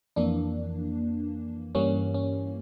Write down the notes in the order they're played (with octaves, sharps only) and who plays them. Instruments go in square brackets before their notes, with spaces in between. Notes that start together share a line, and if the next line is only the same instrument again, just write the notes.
[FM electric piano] F2 E3 A#3 D4
G2 E3 G3 A#3 C#4
C#4